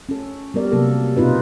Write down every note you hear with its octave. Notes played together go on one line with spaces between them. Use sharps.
C#4 A4
G3 B3 A#4 D5
C3 F#3 A#3 A4
B2 C4 D#4 F4 B4